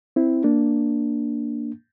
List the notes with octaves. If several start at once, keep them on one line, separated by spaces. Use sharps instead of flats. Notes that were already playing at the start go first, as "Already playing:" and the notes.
C4 E4
A#3 D4